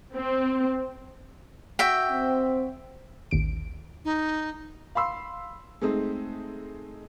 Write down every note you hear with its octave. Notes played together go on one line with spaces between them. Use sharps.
C4
F#4 E5 G5
C4
A1 D#2 D7
D#4
F5 B5 C6 E6
G#3 A3 C4 D#4